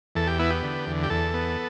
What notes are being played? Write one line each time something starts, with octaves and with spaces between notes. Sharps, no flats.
E2 A4
G4
B3 E4
G4
D3
E2
G4
E2 A4
B3